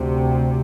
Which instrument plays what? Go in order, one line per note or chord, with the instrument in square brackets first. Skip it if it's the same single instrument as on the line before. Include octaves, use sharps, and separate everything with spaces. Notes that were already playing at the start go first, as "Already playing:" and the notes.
Already playing: [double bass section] D2 C3